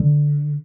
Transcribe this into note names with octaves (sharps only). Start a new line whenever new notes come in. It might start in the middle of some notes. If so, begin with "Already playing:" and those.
Already playing: D3